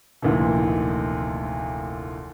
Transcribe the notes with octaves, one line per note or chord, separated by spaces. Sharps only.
F1 D2 A#2 D#3 E3